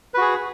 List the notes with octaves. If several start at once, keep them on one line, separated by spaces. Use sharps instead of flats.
F#4 G#4 B4